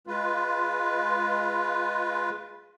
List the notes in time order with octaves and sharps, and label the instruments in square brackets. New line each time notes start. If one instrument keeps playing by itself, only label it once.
[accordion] G#3 F4 B4